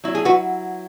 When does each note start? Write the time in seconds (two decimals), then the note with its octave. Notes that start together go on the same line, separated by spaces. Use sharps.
0.04 F#3 E4
0.15 G#4
0.25 F#4 B4